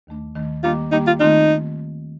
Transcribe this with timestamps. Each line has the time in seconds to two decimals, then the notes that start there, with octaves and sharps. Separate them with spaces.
0.07 D#2 D#3 A3 D4
0.35 D#2 D#3 A3 D4
0.63 D#3 G3 A#3 D4 F4 G4
0.92 D#3 G3 A#3 D4 D#4 G4
1.07 F4
1.20 D#3 A3 C4 D#4 F4